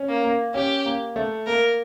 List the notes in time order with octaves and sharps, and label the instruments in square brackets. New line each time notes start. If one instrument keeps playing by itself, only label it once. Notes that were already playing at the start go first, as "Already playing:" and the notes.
Already playing: [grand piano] C#4
[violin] A#3
[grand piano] A#3
[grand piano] C#4 [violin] G4
[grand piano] A#3
A3
[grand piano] A#3 [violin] A#4